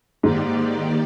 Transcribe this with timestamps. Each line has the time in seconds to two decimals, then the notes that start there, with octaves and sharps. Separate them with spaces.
0.22 G#2 D#3 A#3 D#4 G4 D5